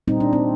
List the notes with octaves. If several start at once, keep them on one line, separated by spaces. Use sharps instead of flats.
A#2 G3 C4 D#4
D4
C4